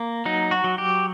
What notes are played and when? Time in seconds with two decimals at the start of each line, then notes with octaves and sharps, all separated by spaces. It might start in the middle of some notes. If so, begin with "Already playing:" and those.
Already playing: A#3
0.25 F#3 D#4
0.51 F#4
0.64 F#3
0.78 G4